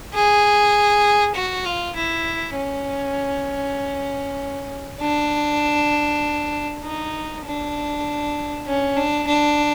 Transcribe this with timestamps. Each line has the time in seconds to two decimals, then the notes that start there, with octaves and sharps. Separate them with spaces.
0.14 G#4
1.35 F#4
1.65 F4
1.95 E4
2.56 C#4
5.00 D4
6.83 D#4
7.44 D4
8.66 C#4
8.96 D4
9.27 D4